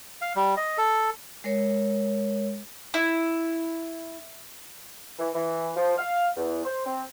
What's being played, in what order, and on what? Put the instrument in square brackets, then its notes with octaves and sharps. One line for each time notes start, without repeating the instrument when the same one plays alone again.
[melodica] F5
G3
D#5
A4
[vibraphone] G#3 A#4 C#5
[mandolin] E4
[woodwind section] E3
E3
F3
F5
E2
C5
C4